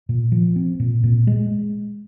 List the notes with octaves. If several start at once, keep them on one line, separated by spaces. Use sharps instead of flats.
A#2
F3
C4
A#2
A#2
G#3